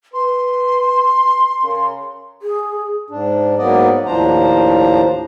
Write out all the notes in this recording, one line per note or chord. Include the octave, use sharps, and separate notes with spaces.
B4 C6
C#3 A#4
G#4
G#2 D4
G#2 F#3 A#3 B3 D5 D#5
D#2 A2 F3 D4 C5 A#5